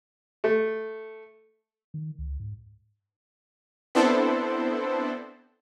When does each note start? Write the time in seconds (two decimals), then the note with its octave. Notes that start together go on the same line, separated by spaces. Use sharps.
0.44 A3
1.94 D#3
2.19 C#2
2.40 G#2
3.95 B3 C4 D4 E4 A4 C5